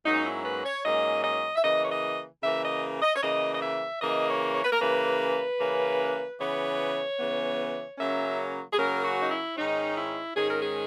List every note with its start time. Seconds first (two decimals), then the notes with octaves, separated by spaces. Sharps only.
0.05 G#2 F#3 A#3 C#4 D#4
0.25 E4
0.45 B4
0.65 C#5
0.85 G#2 F#3 A#3 C#4 D#5
1.24 D#5
1.56 E5
1.63 C#3 E3 A#3 D#5
1.83 C#5
1.91 D#5
2.43 C#3 E3 A#3 E5
2.63 D#5
3.02 D#5
3.16 C#5
3.22 C#3 E3 A#3 D#5
3.55 D#5
3.62 E5
4.01 C#3 E3 A#3 D#5
4.29 C#5
4.54 C#5
4.64 B4
4.72 A#4
4.80 C#3 E3 A#3 C#4 B4
5.60 C#3 E3 A#3 C#4
6.40 C#3 E3 B3 C#5
7.19 C#3 E3 B3
7.98 C#3 F#3 A#3 C#4 E5
8.73 G#4
8.77 C#3 F#3 A#3 C#4 A#4
9.03 F#4
9.21 D#4
9.30 E4
9.57 G#2 D#3 G#3 C#4 D#4
9.97 E4
10.35 G#2 D#3 G#3 C#4 G#4
10.49 A#4
10.62 G#4